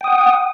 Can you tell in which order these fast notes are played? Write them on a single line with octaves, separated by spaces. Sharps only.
G5 D#6 F#5